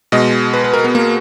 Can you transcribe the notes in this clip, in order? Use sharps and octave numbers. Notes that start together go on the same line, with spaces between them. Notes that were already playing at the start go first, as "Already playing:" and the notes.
B2 G#3 D#5
B4
B4
A#4
B3
A#3